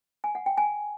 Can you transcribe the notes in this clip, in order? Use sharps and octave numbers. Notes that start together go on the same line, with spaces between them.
G#5
F#5
G5
G#5